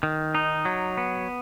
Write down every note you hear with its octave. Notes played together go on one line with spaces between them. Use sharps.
D#3
D#4
F#3
B3